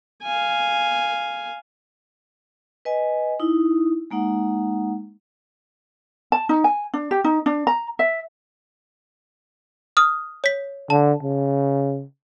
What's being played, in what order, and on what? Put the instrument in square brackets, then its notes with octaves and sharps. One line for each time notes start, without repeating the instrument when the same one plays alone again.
[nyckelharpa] F5 G#5
[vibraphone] B4 D#5 G#5
D#4 E4
G#3 A#3 D#4 F#5
[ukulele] A5
D#4
G#5
D4
G4
D#4
D4
A#5
E5
[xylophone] D#6 F6
C#5 B6
[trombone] D3 [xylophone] A5
[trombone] C#3